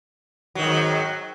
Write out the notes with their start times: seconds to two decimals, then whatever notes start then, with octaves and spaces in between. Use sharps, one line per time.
0.55 F#3
0.59 D#3
0.62 G#2